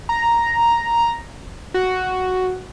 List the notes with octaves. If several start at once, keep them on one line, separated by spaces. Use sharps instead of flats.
A#5
F#4